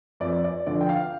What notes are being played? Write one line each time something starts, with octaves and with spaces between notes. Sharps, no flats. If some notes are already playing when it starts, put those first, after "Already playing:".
F2 D5
D5
D3 F3 D5
G5
F5